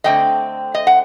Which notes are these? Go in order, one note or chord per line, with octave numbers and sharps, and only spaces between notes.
D3 A3 C4 D#5 G5
D#5
F#5